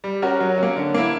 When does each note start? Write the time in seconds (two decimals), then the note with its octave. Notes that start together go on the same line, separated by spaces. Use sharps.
0.04 G3
0.22 C#4 F#4 A#4
0.40 F#3
0.58 A#3 C#4
0.76 D3
0.94 A#3 E4